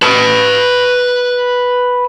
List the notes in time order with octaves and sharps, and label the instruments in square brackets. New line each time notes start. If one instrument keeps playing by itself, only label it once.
[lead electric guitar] B4 A5